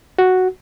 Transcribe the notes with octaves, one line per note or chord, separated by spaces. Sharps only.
F#4